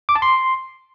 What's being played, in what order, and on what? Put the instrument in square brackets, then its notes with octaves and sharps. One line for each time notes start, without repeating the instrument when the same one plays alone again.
[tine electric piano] D6
A5
C6